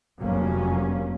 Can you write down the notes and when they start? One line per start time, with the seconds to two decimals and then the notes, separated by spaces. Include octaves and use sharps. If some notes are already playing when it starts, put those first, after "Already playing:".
0.19 F1 G2 F#3 A#3 C#4